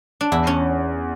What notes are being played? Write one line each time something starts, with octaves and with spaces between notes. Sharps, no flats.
D4
E2 E4
C#4